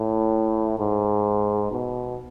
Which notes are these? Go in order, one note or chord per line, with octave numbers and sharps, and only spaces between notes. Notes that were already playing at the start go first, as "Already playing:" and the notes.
Already playing: A2
G#2
B2